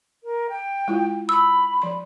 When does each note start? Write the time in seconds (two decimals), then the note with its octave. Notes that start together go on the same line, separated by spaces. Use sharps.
0.23 A#4
0.49 G5
0.88 G#3 E4 F4
1.29 B5 E6
1.82 F3 C6